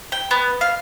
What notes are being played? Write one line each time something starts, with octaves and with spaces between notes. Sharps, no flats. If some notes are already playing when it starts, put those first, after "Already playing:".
G5
B3
F5